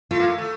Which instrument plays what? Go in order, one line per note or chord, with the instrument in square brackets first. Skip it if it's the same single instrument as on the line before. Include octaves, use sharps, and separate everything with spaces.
[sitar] A3 [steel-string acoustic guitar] F4
[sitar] A#3
A3
A3